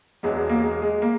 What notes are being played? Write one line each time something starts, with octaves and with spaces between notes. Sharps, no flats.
E1 E2 B2 F#3 G#3
G#3
A#3
G#3
G#3
A#3